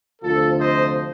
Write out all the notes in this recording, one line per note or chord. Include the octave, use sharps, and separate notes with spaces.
D2 C3 F3 F4 A4
C5 D#5